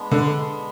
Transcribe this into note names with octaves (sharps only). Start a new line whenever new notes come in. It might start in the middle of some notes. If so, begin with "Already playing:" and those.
Already playing: G#3 B3 D4
D3